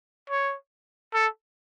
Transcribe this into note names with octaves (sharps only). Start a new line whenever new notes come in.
C#5
A4